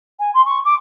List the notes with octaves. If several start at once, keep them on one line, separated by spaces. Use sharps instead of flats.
G#5
C6
C#6
D6